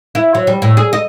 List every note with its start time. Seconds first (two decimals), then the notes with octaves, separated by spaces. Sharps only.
0.15 E4
0.35 F#3
0.47 G3
0.62 A2
0.77 G#4
0.93 D#5